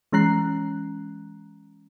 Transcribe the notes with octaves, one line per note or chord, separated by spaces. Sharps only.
E3 G#3 C#4 A#5 F#6 C7